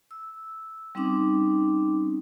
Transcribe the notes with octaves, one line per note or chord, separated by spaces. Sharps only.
E6
G3 C4 C#4 D#4 D6